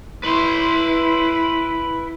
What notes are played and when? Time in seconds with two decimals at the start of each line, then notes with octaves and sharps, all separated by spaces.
0.24 E4 B4 C6